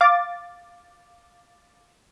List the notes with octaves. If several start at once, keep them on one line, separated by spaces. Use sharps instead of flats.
F5 D6 A6